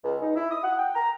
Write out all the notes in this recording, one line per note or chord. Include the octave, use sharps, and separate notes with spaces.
C#2
D#4
E4
D#6
F#5
G5
A#5